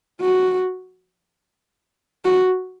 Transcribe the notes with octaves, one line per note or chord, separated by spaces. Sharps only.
F#4
F#4